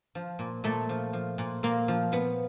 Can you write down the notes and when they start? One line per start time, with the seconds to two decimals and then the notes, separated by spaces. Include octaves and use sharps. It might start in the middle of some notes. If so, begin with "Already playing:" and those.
0.15 F3
0.39 A#2
0.64 A#2 A3
0.89 F3
1.13 F3
1.38 A#2
1.63 A#2 A#3
1.88 F3
2.12 F3 B3